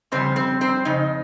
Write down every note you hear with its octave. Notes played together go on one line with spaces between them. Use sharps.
F2 C#3 G3 C4 C5
C4 C5
C4 C5
F2 C#3 D#4